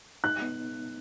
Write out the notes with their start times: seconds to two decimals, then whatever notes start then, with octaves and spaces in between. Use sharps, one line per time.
0.24 D#4 F#6
0.42 B3